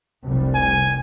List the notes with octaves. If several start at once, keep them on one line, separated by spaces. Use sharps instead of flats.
F1 C2 G3
G#5